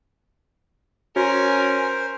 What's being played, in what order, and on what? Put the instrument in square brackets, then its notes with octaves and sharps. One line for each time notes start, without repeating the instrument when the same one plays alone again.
[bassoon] C#4 [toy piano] F#4 [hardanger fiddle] A#4 G#5 [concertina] C5